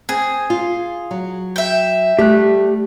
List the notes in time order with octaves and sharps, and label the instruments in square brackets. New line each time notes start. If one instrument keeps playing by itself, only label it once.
[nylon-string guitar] C4 [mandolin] G#4
[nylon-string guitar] F4
F#3
[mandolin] E5 G5
[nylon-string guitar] G3 A3 [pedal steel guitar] G4 F#6